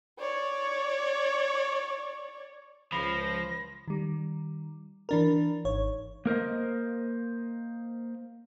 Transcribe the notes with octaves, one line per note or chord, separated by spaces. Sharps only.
C#5 D5
C#2 F3 B5 A#6
D#3 G3
E3 D4 A#4
G#1 C#5
A#3 A#4 C5 D#5